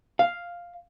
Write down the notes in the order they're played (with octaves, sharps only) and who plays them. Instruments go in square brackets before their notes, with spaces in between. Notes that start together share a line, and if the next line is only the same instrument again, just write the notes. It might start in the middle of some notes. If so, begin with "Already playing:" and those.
[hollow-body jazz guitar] F5